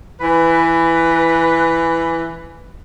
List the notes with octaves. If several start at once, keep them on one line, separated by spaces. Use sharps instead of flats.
E3 B4